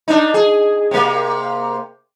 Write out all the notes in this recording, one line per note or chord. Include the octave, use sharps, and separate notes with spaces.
D4 D#4
G#4
C3 A#3